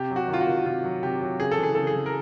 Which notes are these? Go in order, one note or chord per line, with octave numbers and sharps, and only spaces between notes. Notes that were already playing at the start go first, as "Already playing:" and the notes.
Already playing: C3 G4
F#3
F#4
D#3
F4
F#4
D#3
C3 F4
F#3
C3 G4
F#3
C#3 G#4
A4
E3
G#4
C#3 A4
G#4
E3
A#4